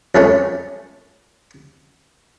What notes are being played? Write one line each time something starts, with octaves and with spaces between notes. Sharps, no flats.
F2 G#3 A3 C#4